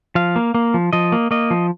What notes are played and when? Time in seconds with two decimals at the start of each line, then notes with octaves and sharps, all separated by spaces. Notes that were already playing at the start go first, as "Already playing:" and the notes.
0.15 F3 F5
0.36 A#3
0.55 A#3
0.74 F3
0.93 F3 D#5
1.12 A#3
1.31 A#3 D#5
1.51 F3